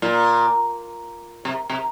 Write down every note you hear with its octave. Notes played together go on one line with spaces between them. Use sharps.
A#2
C3
C3